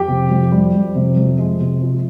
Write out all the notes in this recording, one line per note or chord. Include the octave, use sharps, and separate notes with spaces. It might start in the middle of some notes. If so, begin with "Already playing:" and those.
Already playing: F2 G4 G5
C3
F2
G3
F2
C3
F2
G#3
C3
F3